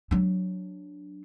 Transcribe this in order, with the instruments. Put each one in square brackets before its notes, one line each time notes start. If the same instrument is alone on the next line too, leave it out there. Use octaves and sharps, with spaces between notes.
[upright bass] F#3 D4